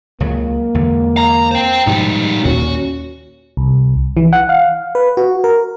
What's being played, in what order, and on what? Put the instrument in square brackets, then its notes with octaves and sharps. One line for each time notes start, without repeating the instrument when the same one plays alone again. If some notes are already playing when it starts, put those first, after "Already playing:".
[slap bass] C#2 C#3 F#3 [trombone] A#3
[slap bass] E2 D3 G#3
[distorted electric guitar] A#5
C5 G5
[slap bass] G#2 B2 F3 [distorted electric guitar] G3 D#4
[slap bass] D#2 A#2 [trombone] C#4 [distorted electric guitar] F#4
[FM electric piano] C2
E3
F#5
F5
B4
F#4
A#4